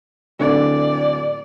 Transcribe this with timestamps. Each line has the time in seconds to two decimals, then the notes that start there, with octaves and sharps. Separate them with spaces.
0.40 D1 D3 D5